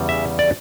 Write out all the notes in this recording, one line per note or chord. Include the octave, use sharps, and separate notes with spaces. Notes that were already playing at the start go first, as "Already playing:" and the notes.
Already playing: E2 C#3 E3 G3
E5
D5